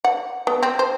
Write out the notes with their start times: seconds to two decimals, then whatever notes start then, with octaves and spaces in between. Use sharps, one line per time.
0.04 F#5
0.47 B3
0.63 C4
0.79 C5